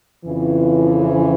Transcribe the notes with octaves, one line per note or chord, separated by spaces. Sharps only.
F2 C#3 E3